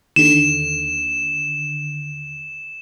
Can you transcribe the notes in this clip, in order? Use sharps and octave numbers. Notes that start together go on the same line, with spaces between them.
D#2 D3 E7